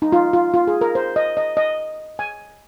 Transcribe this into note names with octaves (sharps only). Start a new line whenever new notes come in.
D#4
F4
F4
F4
G#4
A#4
C5
D#5
D#5
D#5
G#5